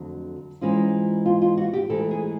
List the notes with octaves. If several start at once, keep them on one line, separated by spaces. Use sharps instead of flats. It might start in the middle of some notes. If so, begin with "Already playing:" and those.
Already playing: F2 D3 F#3 A3
G#2 E3 G#3 C#4 F4
F4
F4
F#4
G4
G#2 E3 A3 A4
G#4